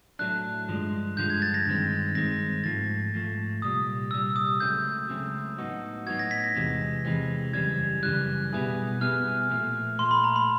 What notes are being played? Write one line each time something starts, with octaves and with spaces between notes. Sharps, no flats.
A2 F#3 A3 D4 F#6
G2 D3 F3 G#3
G2 D3 F3 G#3 G6
G#6
A6
A#6
G2 D#3 G#3 C4
G2 D#3 G#3 C4 A#6
G#2 F3 A3 A6
G#2 F3 A3
C2 A#2 G3 D#6
C2 A#2 G3 E6
D#6
C#2 C#3 F#3 A3 C4 G6
C#2 C#3 F#3 A3 C4
A2 F#3 B3 D#4 F#4
A2 F#3 B3 D#4 F#4 G#6
A#6
B6
A#6
E2 C3 E3 G#3 C4
E2 C3 E3 G#3 C4
F#2 C#3 E3 G3 G#6
F#2 C#3 E3 G3 F#6
B2 G3 B3 E4 G#4
B2 G3 B3 E4 G#4 F6
A#2 F3 A3
A#2 F3 A3 C6
B5
A#5
B5